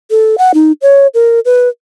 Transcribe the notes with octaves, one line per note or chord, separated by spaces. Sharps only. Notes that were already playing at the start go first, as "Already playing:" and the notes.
A4
F#5
D#4
C#5
A#4
B4